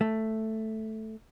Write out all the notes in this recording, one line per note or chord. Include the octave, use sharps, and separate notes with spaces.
A3